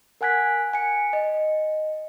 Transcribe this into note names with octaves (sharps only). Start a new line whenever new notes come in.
A#4 F#5 G#5 F#6 G#6 B6
G#5 C#7
D#5